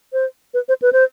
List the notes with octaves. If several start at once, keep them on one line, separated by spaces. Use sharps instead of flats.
C5
B4
C5
B4
C5